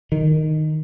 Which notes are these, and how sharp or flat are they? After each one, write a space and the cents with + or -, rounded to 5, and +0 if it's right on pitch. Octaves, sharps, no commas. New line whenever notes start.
D#3 -5